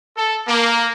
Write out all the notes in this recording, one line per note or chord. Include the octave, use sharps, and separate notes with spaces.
A4
A#3